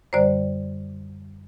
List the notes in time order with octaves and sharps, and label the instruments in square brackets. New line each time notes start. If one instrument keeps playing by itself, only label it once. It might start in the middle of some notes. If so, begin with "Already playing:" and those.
[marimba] F#2 D3 G3 C5 D5